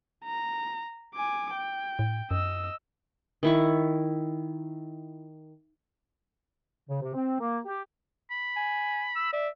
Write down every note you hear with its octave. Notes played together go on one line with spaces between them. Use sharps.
A#5
G#5 D6
G5
A2
F#2 D#5 E6
D#3 E4 C#6
C#3
C3
C4
A#3
G4
B5
G#5
E6
D5 E5